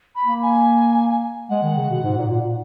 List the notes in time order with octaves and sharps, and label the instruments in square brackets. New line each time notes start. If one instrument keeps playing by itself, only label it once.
[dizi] B5
[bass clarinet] A#3
[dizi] G#5
[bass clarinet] G#3 [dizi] F#5
[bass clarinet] D#3
C#3
B2
G#2
A#2
A#2